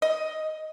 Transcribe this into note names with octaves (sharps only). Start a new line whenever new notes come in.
D#5